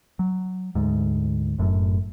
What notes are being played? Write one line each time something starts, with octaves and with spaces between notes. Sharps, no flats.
F#3
D2 G#2
F#1 F#2 A2